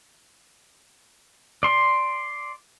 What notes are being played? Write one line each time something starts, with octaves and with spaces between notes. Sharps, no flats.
D5 C6